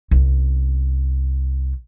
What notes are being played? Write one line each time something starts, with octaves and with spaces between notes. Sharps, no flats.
C2 C#4